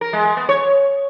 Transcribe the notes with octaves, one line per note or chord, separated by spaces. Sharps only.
A#4
G#3
G#3
B3
C#5